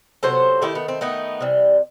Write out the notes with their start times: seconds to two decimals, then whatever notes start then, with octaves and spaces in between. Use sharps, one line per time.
0.23 C3 F#3 B3 A4 C5
0.62 D#3 A3 E4 G4
0.75 B3
0.88 C4
1.01 D#3 A3 B3 D#4
1.41 C3 E3 G3